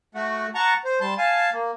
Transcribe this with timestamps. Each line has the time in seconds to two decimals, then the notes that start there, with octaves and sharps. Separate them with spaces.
0.15 A3 F#4
0.55 F#5 A5 A#5 C#6
0.85 C5
1.01 G3 A5 C6
1.18 F5 G#5 A5
1.53 A#3